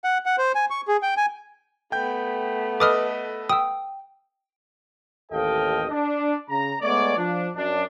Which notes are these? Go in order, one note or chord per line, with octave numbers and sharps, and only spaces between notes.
F#5
F#5
C5
G#5
C#6
G#4
G5
G#5
A3 B3 G5 G6
A4 B4 D#5 D6 D#6 F6
G5 D#6 E6
A1 D#2 A4 D#5 F5 G5
D4
C#3 A#5
G#3 A3 B3 C#5 D5
F3 D4
F#2 D4